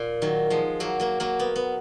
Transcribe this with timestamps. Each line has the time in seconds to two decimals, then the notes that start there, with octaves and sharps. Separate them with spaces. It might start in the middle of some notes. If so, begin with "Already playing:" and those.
Already playing: A#2
0.22 D#3 F#3
0.50 F3 G#3
0.80 F#3 A#3
1.00 F#3 A#3
1.20 F#3 A#3
1.39 B3
1.56 B3